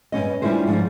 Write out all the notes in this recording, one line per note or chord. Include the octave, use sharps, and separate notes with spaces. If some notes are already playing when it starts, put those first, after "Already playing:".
G2 D#3 C#4 D#5
G3 C#4 D4 E4 F4 C5
G#2 F3 G3